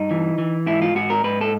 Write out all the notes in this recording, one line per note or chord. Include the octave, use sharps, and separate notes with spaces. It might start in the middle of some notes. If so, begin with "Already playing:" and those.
Already playing: G2 D#4
E3
E3
G#2 E4
F4
G#2 F#4
A#4
G#2 B4
A4